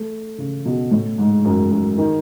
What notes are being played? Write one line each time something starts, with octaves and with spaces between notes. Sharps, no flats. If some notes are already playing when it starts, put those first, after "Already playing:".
Already playing: A3
C#3
B2
A2
G#2
F#2
F#2
D#3